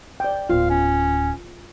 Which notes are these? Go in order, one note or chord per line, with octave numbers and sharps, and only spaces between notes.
D5 G5
D1 B3 F4 F5
C#4